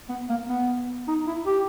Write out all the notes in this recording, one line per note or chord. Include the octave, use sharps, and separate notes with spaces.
B3
A#3
B3
D#4
E4
G4